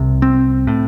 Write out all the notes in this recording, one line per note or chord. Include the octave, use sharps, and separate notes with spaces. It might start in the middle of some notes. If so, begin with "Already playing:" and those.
Already playing: C2 C3
C4
A2